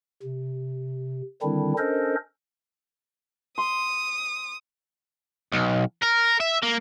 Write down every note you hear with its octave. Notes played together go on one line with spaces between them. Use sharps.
C3
D3 D#3 G3 C4 D4 E4
C#4 D4 A4 A#4 C5 D#5
C6 D#6
B1
A#4
E5
A#3